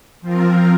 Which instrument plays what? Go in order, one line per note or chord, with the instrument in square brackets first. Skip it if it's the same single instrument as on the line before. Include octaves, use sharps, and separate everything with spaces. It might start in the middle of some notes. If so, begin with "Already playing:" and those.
[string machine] F3 C4 F4 A#4